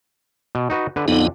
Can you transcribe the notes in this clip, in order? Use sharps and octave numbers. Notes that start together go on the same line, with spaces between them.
B2
D#4 F#4 B4
D3 B4
F2 D3 B3 D#4